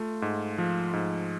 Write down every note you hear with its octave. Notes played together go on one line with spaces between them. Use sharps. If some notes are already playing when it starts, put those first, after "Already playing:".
Already playing: A3 F4
G#2
F3
G#2